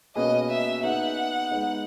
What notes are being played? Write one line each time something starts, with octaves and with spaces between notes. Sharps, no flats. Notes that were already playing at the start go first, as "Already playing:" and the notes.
B2 A#3 C#4 G#4 B4 D#5
E5
B3 D#4 G#4 B4 E5 F#5
G#3 B3 D#4